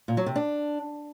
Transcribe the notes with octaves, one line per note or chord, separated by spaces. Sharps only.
A#2
F#3
C3
D4